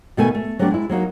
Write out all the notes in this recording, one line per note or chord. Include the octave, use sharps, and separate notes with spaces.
B2 D#3 A3 B4 G#5
A3
F#3 G3 A3 B3 D4
G#3 E4
F#3 A#3 D#4 F#4